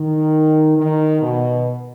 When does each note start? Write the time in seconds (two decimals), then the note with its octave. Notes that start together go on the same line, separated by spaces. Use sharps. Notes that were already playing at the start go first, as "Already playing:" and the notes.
Already playing: D#3
0.78 D#3
1.22 B2